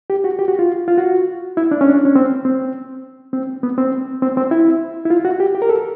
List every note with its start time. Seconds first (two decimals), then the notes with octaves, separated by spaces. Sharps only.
0.10 G4
0.24 F#4
0.39 G4
0.48 F#4
0.59 F4
0.88 F4
0.98 F#4
1.57 E4
1.71 D4
1.81 C#4
1.90 D4
2.05 C#4
2.16 C4
2.45 C4
3.33 C4
3.63 B3
3.78 C4
4.22 C4
4.37 C4
4.51 E4
5.05 E4
5.10 F4
5.25 F#4
5.40 G4
5.55 G4
5.62 A#4
5.69 A4